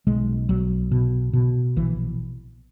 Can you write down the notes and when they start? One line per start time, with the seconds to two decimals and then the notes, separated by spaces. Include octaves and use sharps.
0.07 B1 G#3
0.49 B1 F#3
0.91 B2
1.33 B2
1.76 A#1 E3